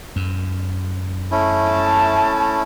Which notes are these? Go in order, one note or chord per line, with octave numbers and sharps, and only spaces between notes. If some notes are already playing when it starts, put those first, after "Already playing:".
F#2
A3 C#4 E4
A5